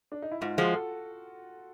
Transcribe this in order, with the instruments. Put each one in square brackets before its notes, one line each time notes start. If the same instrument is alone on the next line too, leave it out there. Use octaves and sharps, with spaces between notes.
[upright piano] D4
D#4
E4
[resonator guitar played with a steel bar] G#2 [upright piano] F4
[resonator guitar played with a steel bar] F3 G#3 [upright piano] F#4
[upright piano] A4